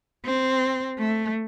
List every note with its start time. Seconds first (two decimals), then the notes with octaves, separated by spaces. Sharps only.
0.25 C4
0.99 A3